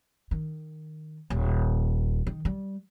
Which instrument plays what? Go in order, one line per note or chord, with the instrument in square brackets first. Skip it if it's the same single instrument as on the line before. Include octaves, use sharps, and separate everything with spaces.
[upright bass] D#3
D#1
D#3
G3